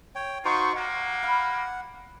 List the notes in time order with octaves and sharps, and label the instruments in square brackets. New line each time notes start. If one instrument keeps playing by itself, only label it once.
[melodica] C#5 G5
[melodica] D#4 F#4 C5 [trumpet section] F4 C#6
[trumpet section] G3 A#3 [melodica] F#5
[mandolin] F5 B5 F6